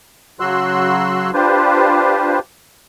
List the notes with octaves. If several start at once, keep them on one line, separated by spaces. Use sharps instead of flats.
C#3 F#3 F#4 C6 E6 F#6
D4 F4 G4 B4 C5